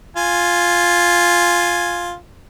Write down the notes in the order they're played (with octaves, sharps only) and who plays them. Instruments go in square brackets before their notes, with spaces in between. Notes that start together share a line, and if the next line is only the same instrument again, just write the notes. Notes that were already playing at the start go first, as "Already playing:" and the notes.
[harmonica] F4 G#5